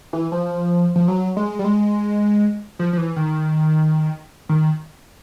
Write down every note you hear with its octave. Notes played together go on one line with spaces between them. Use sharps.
E3
F3
F3
F#3
G#3
G3
G#3
F3
F3
E3
D#3
D#3